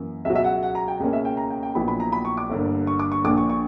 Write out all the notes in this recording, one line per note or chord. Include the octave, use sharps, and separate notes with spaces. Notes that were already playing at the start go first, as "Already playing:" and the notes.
Already playing: F#2 E3 A#3
C#2 B2 F#3 E5
E5
F#5
F#5
A#5
G5
C#2 B2 A#3 C#4
E5
G5
A#5
G5
G5
A#1 A#2 F#3 B3 E4 B5
B5
A#5
B5
C#6
D6
G1 G2 D3 A#3
C#6
D6
C#6
A#1 A#2 A#3 D4 D6
C#6
C#6